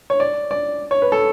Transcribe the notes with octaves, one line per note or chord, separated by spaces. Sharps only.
C#5
D5
D5
C#5
B4
A4